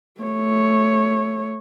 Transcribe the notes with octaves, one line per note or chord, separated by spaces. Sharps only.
A3 C#5